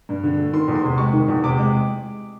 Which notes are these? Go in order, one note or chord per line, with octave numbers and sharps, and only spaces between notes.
G2
D3
A3
D#3 C6
E2
C6
C3
G#3 C#6
D#3
E2
C3 D6
G#3